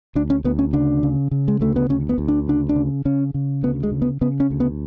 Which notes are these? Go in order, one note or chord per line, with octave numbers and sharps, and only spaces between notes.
D2 D4
C#4
D2 B3
C#4
C#3 D4
C#3
C#3
G#3
D2 A3
B3
D2 C#4
B3
D2
D4
C#3 D4
D4
C#3
C#3 C#4
C#3
D2 B3
G#3
C#3
B3
C#3 B3
C#4
D2
B3